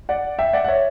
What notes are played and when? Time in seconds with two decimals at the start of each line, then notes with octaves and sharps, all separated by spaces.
0.09 D5 F#5
0.39 E5 G5
0.53 D5 F#5
0.64 F#5
0.68 C#5 E5